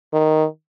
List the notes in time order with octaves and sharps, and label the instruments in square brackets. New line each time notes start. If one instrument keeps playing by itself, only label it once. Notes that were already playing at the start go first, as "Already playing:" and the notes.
[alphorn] D#3